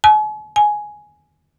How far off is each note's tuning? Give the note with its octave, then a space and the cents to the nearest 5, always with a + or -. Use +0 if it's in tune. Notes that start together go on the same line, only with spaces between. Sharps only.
G#5 +45
G#5 +10